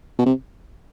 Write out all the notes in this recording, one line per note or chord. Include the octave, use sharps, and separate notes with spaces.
B2
C3